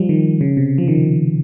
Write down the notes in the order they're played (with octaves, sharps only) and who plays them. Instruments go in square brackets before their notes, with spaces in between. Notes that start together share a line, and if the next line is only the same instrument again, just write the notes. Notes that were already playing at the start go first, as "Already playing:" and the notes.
Already playing: [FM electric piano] F3 G3
D#3
C#3
C3
F3
D#3